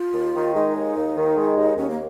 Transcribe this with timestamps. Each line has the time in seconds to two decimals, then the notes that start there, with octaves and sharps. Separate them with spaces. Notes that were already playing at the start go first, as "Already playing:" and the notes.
Already playing: F4
0.14 D#2
0.35 D#3
0.55 G#3 D#4
0.75 D#2
0.96 D#2
1.16 D#3
1.36 G#3
1.57 D#2
1.77 D#2 C#4
1.90 A#3